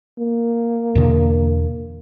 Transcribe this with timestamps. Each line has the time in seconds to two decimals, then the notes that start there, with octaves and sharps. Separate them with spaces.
0.19 A#3
0.95 E2 B2 D3